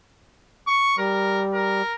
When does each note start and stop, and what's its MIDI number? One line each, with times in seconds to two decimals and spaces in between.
0.67 0.95 85
0.98 1.82 55
0.98 1.43 70
1.54 1.95 70